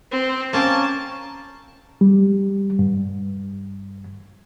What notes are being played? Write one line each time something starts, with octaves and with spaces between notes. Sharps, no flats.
C4
A#3 C#4 G5 A5
G3
G2